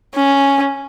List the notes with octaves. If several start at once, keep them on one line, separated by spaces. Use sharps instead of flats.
C#4